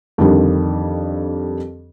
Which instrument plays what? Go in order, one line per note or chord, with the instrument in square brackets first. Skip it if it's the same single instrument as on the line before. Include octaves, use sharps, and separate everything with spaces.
[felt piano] F2 D3 D#3 G3 D4